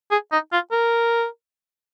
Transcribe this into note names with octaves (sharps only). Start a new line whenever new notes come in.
G#4
D#4
F4
A#4